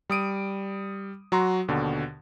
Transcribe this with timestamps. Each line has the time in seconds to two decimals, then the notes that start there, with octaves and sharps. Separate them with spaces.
0.10 G3 D#6 D7 D#7
1.32 F#3 F#4 A#5 C6
1.68 D#2 B2 D3